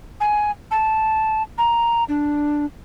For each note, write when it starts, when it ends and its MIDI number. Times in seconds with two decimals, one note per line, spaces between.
0.21 0.51 80
0.71 1.43 81
1.58 2.04 82
2.08 2.66 62